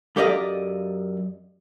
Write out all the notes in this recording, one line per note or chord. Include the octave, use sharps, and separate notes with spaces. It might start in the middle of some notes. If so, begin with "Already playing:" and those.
F#2 G4 A4 D5 D#5 F5